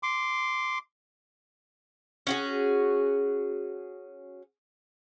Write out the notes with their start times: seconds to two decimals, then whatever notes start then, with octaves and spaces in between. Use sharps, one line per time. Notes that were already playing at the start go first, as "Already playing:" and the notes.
0.03 C6 D6
2.27 C#4 F#4 G#4